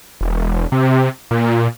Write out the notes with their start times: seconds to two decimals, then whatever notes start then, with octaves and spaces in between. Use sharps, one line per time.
0.21 E1
0.72 C3
1.31 A#2